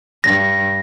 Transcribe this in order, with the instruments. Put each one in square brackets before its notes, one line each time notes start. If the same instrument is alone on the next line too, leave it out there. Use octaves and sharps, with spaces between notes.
[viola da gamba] G2 [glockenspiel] A#6